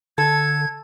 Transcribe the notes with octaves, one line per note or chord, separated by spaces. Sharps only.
D3 A4 G#6